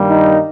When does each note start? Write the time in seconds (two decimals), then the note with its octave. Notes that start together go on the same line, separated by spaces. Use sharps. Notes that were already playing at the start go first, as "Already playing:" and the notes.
Already playing: G2 D#3 G3 A#3
0.10 D#4